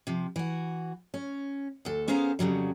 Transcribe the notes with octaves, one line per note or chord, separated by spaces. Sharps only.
C3 F3
E3 F#4
C#4
D2 A4
B3 C#4 G#4 C5 F5 A#5
F2 C#3 F#3 G3